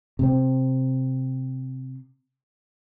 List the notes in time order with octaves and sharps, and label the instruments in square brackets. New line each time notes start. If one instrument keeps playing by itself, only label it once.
[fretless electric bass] C3 C4